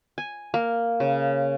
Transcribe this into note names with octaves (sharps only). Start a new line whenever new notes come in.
G#5
A#3
C#3